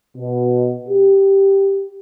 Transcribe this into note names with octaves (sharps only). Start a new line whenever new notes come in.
B2
G4